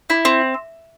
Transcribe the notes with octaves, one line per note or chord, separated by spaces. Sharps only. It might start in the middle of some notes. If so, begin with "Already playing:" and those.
E4
C4